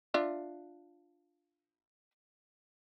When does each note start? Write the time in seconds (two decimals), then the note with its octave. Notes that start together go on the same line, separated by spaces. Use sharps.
0.14 D4 F4 E5